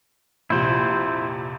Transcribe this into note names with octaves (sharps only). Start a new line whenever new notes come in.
A#1 F2 C3 E4 C5